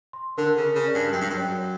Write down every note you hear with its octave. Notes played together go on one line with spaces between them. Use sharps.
C6
D3 A#4
C#3
A#4
C#3
D5
G2
F#2 G5
G2
F#2
C#5